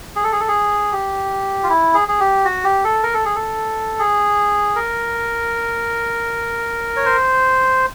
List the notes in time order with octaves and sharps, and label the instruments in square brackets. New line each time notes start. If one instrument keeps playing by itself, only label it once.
[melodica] G#4
A4
G#4
A4
G#4
G4
F4
E4
G#4
G#4
G4
F#4
G4
A4
A#4
A4
G#4
A4
G#4
A#4
C#5
C5